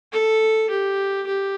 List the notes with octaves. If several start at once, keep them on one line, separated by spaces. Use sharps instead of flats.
A4
G4
G4